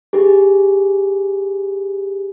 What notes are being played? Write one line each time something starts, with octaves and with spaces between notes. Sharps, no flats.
G4 G#4